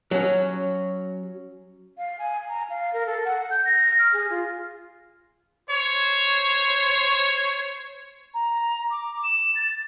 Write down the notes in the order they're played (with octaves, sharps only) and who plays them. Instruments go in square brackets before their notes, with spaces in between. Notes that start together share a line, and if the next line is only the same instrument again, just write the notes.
[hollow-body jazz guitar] F#3 C#4
[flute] F5
G#5
A#5
F5
A#4
A4
F#5
G6
A#6
F6
G#4
F4
[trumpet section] C5 C#5
[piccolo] A#5
D6
E7
A6